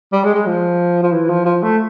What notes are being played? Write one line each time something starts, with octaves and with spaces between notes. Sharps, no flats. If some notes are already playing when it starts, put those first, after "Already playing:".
G3
G#3
G#3
F3
F3
E3
F3
F3
A3